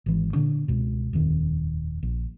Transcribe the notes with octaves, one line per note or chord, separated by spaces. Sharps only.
G#1 E3
A#2 D3 D4
C#2 B2
D#1 F2 D#3
A#1